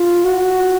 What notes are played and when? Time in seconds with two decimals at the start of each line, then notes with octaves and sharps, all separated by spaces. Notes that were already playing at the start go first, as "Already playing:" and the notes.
Already playing: F4
0.25 F#4